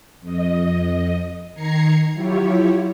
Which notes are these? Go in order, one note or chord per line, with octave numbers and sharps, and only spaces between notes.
F2 D#5
D#3 A#5 G#6 C7 C#7
F#3 E4 F4 G4 C#5